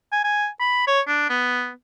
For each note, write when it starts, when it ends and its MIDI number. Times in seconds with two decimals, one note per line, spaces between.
0.12 0.22 80
0.24 0.47 80
0.60 0.86 83
0.87 1.01 73
1.08 1.25 62
1.30 1.70 59